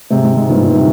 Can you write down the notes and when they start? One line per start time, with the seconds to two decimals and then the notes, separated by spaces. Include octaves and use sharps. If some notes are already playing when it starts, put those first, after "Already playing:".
0.11 G#2 C3
0.23 G#2
0.36 G#2
0.49 G2 A#2
0.62 G2 A#2
0.75 C3